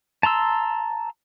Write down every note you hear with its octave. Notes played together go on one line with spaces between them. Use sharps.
A5 A#5 C6 E6